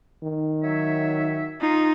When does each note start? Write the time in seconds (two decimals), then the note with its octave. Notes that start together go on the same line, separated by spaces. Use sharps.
0.23 D#3
0.62 F#3 C#5 E5
1.61 D#4 F4